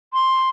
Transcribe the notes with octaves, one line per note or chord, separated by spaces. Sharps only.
C6